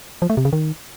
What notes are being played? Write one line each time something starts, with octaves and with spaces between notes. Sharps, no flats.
F3
A3
C3
C#3
D#3